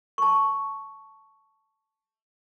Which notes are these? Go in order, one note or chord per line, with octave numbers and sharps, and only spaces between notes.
A5 C#6